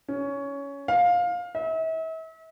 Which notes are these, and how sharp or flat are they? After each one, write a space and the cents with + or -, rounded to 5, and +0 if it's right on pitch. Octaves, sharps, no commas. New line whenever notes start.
C#4 +15
F5 +20
E5 -40